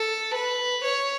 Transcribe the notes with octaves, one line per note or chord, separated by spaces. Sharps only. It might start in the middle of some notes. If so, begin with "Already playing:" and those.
Already playing: A4
B4
C#5